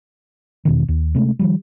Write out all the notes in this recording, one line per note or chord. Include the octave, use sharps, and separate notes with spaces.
E2 B2 D#3
D#2
C3 G#3 A3 C#4
D#3 F3 G3